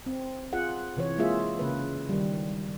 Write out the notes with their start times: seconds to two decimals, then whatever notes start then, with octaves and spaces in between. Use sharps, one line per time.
0.06 C4
0.53 F4 G#4 F#5
0.96 C3 E3 C#5
1.18 G#3 A#3 F4 G#4 E5
1.59 C#3 A#3 B4
2.09 D#3 G3